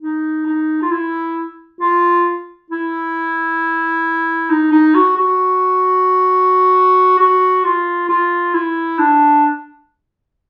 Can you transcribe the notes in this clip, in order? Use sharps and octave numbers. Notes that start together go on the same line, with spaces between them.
D#4
D#4
F4
E4
F4
E4
D#4
D#4
F#4
F#4
F#4
F4
F4
E4
D4